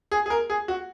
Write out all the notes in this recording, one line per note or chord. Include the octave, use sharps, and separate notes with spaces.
G#4
G#4
A#4
G#4
F#4